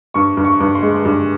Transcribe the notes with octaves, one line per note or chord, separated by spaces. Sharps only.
G2 C#6
G2
C#6
G2
C6
G#3
G2